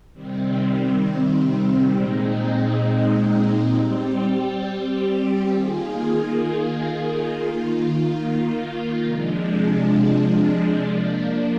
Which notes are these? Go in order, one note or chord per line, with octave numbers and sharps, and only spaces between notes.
C3 D#3 G3 C4
A#2 G#3 C4 D#4
G3 C4 G4
D#3 A#3 F4 G#4
D#3 A#3 F4
C3 F3 G#3 D4
F3 A#3 D4